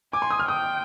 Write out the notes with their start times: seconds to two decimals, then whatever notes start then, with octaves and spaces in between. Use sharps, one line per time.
0.13 G#5 D6
0.22 C6
0.31 D#6
0.40 F6
0.48 G5 D#6